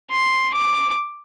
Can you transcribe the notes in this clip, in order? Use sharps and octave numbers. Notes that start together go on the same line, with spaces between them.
C6
D6